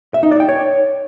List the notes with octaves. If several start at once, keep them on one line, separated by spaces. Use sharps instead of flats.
E5
D#4
D5
G5
C#5